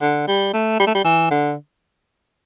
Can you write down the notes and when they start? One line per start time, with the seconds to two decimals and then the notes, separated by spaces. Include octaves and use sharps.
0.01 D3
0.28 G3
0.53 A3
0.80 G3
0.87 A3
0.95 G3
1.04 E3
1.31 D3